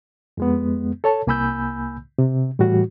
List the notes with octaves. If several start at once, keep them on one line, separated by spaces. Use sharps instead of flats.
F2 G#3 B3
A4 C#5 A5
C2 A#3 G#5 B5 E6 G6
C3
A2 E3 G3 F#4